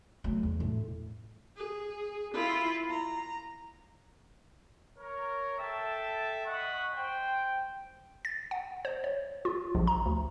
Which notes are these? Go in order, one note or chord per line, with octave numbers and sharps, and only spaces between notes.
F#3 A3
E2
A2
G#4
E4 F4
A#5
A#4 C#5
A4 E5 G5 A5
D#5 F#5 B5 C#6
C5 G5
A6
F#5
C5
C#5
F4
A#1
A#5
D2